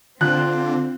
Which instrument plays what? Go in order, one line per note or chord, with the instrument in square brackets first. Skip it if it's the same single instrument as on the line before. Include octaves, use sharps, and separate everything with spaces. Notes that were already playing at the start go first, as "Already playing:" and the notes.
[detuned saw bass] D3 [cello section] C4 [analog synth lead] F4 [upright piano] F#6